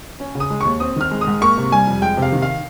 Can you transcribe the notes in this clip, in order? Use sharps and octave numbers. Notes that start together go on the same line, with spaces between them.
C#4
C#3
D#6
G#3
D#2 C#6
C4 D#6
D#3 F6
G#3
D#6
G#2
A#3 C#6
C3
G3 G#5
F2
G#3 G5
C3
F5
D#3
F5